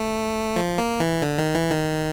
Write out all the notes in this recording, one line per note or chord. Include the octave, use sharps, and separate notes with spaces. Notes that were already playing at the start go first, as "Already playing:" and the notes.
Already playing: A3
F3
A#3
E3
D3
D#3
E3
D#3